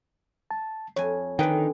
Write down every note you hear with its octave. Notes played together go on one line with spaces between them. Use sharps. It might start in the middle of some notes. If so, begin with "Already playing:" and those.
A5
F2 C#5 G#5
D3 D#3 G#4 B4 G5